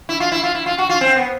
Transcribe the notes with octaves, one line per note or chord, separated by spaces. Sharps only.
E4
F4
E4
F4
E4
F4
F#4
F4
C4
B3